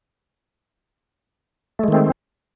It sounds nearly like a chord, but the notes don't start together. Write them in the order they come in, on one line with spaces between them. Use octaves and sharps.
A3 G#3 D#3 C4